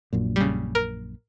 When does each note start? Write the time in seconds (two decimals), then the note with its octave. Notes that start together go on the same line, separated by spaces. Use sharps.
0.13 A#1 F#2 A#2
0.36 C#3 G3
0.75 A#4